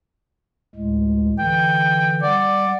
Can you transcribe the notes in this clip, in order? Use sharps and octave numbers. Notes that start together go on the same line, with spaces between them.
D2 A2 G#3
D3 E3 G5
G3 D5 F#5